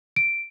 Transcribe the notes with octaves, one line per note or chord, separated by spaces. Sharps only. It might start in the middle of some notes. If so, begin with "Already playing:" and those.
D7